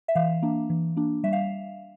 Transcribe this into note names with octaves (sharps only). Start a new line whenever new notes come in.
E5
E3 F5
A#3 D4
E3
A#3 D4
G3 E5
F5